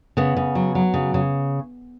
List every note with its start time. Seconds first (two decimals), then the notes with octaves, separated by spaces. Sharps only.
0.17 C#3 B3
0.37 C#3
0.55 F#3
0.75 F#3
0.94 C#3
1.14 C#3